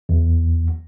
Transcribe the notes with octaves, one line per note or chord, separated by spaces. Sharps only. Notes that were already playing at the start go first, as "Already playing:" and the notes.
E2